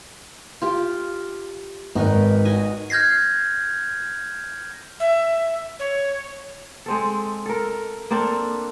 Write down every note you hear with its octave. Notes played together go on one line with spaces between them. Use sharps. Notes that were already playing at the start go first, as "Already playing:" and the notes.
F4 G4
G#1 D#4 A#4 B4
F#4 D#5 G#5
F6 G6 G#6 A#6 C7
E5
C#5
G#3 C4 A4
A4 A#4
A#3 C4 D4 A4